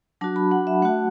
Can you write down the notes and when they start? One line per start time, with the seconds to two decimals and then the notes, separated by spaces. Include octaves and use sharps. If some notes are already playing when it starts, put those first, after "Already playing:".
0.21 F#3 D4 F#4 A5
0.36 B5
0.51 F#5
0.67 E5
0.82 A3 F#4 F#5